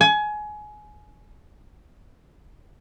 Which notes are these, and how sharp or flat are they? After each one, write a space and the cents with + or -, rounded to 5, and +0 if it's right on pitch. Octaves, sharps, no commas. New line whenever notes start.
G#5 +25